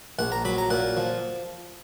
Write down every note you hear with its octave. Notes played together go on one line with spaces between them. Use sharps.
A#1 F#5
A#5
F#3 B5
A#5
A#2 F#5
F3